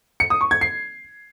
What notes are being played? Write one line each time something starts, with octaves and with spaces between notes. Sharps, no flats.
C#7
D#6
C#6
G#6
C7